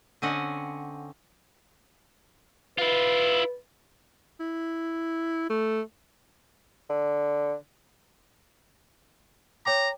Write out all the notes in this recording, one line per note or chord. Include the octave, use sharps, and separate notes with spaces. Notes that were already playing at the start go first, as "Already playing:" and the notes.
D3 C4 C#4 D#5 F#5
E4 F4 B4
E4
A3
D3
C#5 G5 A#5 D6